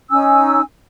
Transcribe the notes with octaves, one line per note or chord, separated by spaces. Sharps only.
C#4 D#4 G#5 E6